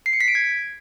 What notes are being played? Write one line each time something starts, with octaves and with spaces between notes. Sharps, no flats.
C7
C#7
B6
D7
G#6